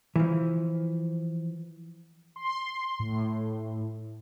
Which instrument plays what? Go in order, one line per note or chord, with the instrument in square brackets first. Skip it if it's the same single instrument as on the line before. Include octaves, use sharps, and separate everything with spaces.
[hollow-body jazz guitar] E3 F3
[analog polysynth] C6
A2